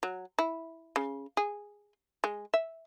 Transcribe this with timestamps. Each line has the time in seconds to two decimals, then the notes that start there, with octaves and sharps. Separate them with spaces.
0.03 F#3
0.38 E4
0.96 C#3
1.37 G#4
2.24 G#3
2.54 E5